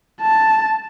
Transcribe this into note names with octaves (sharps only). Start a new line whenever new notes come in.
A5